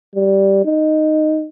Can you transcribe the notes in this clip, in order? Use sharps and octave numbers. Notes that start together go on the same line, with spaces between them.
G3
D#4